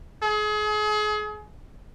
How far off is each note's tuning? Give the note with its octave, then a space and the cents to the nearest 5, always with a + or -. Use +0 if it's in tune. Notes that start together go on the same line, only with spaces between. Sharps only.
G#4 +35